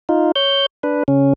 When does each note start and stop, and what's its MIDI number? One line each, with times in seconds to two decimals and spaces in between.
0.09 0.32 63
0.09 0.32 65
0.36 0.66 73
0.36 0.66 91
0.83 1.03 62
0.83 1.03 71
1.08 1.33 49
1.08 1.33 61